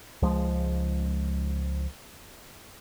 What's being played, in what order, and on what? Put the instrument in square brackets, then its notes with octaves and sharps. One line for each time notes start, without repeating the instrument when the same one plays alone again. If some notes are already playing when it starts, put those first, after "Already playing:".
[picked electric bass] C#2 F3 G#3